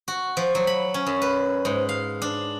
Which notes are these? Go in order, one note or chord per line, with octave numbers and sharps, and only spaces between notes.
F#4
F3
F#3
B5
C#4
F#2
B4
G#2
F5
D4